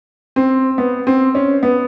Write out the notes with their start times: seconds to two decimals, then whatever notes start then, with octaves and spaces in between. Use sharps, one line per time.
0.36 C4
0.78 B3
1.07 C4
1.35 C#4
1.63 B3